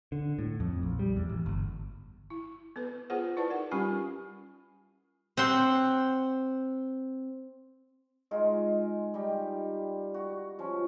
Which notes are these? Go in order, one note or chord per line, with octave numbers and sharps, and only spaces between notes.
D3
A2
F2
A#1
G3
E2
A1
G1
E4
B3 A4 B4
B3 F4 G#4 B4 C5 F#5
E4 B4 D5 A5
D#4 A#4 F#5
G3 C#4 F4 G4 G#5 C#6
C4 F#5 C6
G#3 D#4 F4 G#4
G3 D#4 G4
F#4
F3 C#4